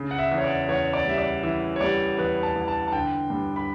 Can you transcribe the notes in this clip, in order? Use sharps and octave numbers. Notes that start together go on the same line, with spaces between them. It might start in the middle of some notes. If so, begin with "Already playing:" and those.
Already playing: C#3
F#5
E5
E2
C#5
D5
E2 C#5
D5
G3 E5
D5
E3 E5
C#5
G3 D5
E2 B4
A5
E2
A5
A5
D3 G5
G2
B5